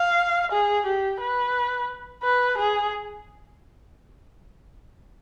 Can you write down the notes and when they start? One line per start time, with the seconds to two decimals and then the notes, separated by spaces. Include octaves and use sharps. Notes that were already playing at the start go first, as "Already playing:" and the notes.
Already playing: F5
0.52 G#4
0.86 G4
1.21 B4
2.23 B4
2.58 G#4